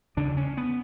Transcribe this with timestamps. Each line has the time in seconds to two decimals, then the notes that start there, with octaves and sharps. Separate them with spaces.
0.17 E2 C#3 D4
0.37 C#4
0.57 B3